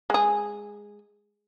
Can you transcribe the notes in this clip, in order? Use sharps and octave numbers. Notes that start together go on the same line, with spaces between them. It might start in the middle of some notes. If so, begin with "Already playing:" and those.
G#3 G#4